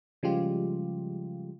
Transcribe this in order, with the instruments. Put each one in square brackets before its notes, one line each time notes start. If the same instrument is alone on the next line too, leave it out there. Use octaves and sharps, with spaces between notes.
[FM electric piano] C#3 F3 G3 G#3 F4 G4